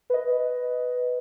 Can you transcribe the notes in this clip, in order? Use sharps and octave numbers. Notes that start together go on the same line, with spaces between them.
B4 D#5